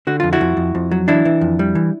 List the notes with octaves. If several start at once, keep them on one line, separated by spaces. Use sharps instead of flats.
D3 F#4
F2 F4
E4 F#4
F2
F2
F2
F#3
E3 D4 E4
E3
F2
G3
E3